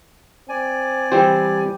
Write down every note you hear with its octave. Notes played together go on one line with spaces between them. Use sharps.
C4 D5 G#5
E3 G3 C4 G4 C5